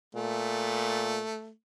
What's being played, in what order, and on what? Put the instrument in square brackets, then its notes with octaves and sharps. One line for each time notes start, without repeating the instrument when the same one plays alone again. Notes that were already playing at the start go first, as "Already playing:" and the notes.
[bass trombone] A#2 [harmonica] A3